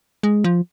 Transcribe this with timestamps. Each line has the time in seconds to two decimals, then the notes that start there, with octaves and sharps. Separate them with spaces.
0.23 G#3
0.44 F3